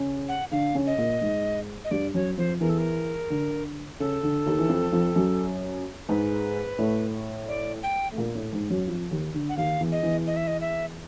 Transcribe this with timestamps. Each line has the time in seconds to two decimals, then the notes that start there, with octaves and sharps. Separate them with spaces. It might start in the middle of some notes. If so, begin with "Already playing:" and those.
Already playing: C#3 C#4
0.28 F#5
0.51 D3 D4 F5
0.75 C#3 C#4
0.87 D#5
0.98 A#2 A#3
1.21 G#2 G#3
1.84 D#5
1.91 G2 G3 D5
2.14 F#2 F#3 C#5
2.37 F2 F3 C5
2.60 E2 E3 A#4
2.69 A4
2.78 A#4
3.30 D3
4.00 C#3 A4
4.23 D3
4.46 D#2 D#3
4.59 E3
4.69 F2 F3
4.92 F2 F3
5.16 F#2 F#3
6.09 G#2 G#3 B4
6.78 A2 A3
7.48 D5
7.83 G5
8.12 A3
8.18 A#2 A#3
8.35 A2 A3
8.52 G#2 G#3
8.70 F#2 F#3
8.87 F2 F3
9.11 D#2 D#3
9.34 D3
9.49 F#5
9.57 D#2 D#3 F5
9.80 E2 E3
9.92 D#5
10.03 E2 E3
10.27 D#5
10.36 E5
10.47 D#5
10.61 E5